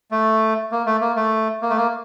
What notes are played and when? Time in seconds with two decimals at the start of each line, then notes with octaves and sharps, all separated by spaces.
0.11 A3
0.72 A#3
0.86 A3
1.01 A#3
1.16 A3
1.62 A#3
1.70 A3
1.77 A#3